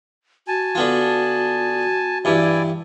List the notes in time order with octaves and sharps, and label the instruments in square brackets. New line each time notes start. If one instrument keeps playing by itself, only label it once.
[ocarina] F#4 [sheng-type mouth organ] G#5 A5
[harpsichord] D3 B3 F4
[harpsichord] G2 E3 [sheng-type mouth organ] E4 D5 G#5